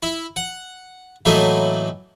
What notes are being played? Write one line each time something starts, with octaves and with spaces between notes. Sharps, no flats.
E4
F#5
A2 E3 F#3 A3 A#3 D#4